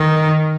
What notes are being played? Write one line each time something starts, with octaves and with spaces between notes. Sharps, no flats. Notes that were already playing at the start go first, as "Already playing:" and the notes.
Already playing: D#3